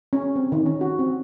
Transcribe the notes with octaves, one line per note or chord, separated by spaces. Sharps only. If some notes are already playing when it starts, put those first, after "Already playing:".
C#4
C4
D#3
C#4
F#4
C4